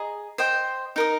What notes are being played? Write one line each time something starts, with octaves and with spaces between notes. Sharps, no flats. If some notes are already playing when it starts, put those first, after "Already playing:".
Already playing: G#4 D#5 A#5
C5 D#5 G5
D#4 A#4 D#5